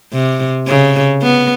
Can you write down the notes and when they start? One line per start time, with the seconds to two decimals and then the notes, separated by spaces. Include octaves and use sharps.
0.13 C3
0.67 C#3
1.22 B3